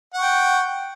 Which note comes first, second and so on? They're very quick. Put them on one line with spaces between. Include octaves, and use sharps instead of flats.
F#5 C#6 G5